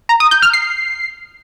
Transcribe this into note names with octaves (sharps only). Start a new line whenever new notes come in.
A#5
D#6
G6
F6
C7